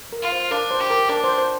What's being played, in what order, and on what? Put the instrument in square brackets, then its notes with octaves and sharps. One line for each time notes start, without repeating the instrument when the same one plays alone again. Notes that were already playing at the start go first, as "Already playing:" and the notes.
[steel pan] A#4
[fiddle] F4
[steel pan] C5
[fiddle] D4 [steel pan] A#4
[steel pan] C5
[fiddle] G4
[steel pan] A#4
[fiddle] D4 [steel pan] A#4
[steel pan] C5
C5